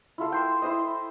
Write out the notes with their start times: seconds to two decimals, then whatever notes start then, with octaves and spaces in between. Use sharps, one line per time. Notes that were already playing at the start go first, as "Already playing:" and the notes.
0.18 E4 F4 A4 F5
0.32 G5 C6 E6
0.62 E4 C5 D#5